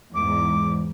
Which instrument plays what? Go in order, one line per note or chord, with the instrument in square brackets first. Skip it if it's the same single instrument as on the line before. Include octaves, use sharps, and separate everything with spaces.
[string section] E2 G#2 [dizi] D6